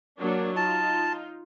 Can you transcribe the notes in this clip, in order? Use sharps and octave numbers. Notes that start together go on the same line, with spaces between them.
F#3 A#3 D4
D#4 F4 A5